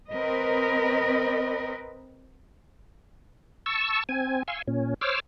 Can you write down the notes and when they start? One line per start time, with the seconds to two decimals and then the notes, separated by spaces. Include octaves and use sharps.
0.13 C4 A#4 B4 D#5
3.66 A5 C#6 E6
4.09 C4 G#5
4.48 F5 G#5 C6 C#6 E6
4.67 A#2 C#4
5.01 C5 C#5 D6 E6 F6